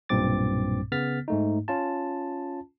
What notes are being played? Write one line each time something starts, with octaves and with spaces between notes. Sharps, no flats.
B1 G2 A#2 C4 D6 A6
C#3 B3 F6 A6 B6
G#2 A3 D#4
C#4 F4 A5